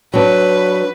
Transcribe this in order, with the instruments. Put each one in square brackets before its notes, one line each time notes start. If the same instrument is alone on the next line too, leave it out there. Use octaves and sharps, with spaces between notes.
[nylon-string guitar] F#3 D4 [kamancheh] B4